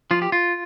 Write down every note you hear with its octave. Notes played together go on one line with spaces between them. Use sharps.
F3 F4
G4
F4